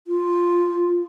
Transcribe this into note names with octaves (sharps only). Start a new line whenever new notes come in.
F4